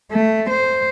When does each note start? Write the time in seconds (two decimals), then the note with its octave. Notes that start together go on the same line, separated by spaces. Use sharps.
0.11 A3
0.50 C5